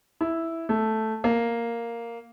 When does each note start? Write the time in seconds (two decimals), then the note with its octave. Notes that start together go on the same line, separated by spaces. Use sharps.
0.21 E4
0.69 A3
1.24 A#3